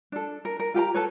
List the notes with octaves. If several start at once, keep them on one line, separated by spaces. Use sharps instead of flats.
D4 A4
A#4
A#4
F4 G4 G5 A#5
A4 B4 C#5